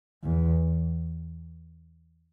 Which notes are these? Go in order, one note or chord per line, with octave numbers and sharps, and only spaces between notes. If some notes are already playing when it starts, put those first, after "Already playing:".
E2